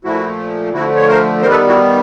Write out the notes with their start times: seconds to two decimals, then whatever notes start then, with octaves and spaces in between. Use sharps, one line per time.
0.04 A#2 F3 A3 E4 F#4
0.73 D3 F3 A3 E4 F#4
0.96 C#5
1.08 A#4 C5
1.42 D#3 G3 B3 A#4 C5
1.50 A4 B4
1.68 E4 F#4